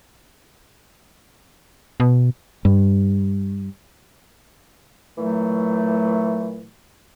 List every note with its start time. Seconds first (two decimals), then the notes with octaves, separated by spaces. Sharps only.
2.00 B2
2.65 G2
5.18 A#2 E3 F#3 A3